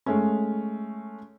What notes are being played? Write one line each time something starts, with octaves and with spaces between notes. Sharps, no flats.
G#3 A3 C#4